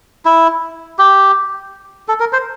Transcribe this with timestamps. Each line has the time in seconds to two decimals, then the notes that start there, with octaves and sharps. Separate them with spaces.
0.25 E4
0.99 G4
2.08 A4
2.20 A#4
2.33 C5